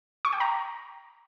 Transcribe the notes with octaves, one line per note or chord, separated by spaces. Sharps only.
C#6
G5
A#5